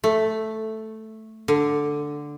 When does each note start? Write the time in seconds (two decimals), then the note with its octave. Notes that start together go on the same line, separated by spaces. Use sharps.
0.04 A3
1.48 D3